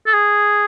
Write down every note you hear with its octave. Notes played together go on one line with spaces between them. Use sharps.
A4
G#4